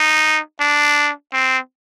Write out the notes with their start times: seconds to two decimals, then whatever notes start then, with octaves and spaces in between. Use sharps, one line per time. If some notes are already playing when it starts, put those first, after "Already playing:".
Already playing: D#4
0.60 D4
1.33 C4